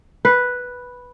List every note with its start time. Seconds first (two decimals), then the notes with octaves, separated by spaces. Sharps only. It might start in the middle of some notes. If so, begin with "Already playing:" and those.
0.25 B4